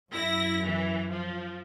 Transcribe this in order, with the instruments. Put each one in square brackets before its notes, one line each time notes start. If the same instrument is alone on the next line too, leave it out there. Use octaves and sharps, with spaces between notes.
[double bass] F#2 [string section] E4 A#6
[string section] E3
F3